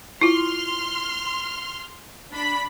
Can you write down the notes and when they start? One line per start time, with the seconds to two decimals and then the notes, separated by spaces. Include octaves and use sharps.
0.21 E4 F4 C6 F6
2.32 D4 B5 B6